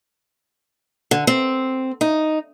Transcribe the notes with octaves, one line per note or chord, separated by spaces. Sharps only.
D3
C4
D#4